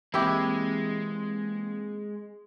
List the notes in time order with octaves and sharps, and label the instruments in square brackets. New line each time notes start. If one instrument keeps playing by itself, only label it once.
[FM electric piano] E3 A#3 C4 [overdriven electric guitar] G#3 [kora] E4 G4